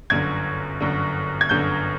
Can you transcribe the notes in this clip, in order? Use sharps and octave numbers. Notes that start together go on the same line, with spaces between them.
G1 F#2 D3 G#6
G1 F#2 D3
G#6
G1 F#2 D3 G6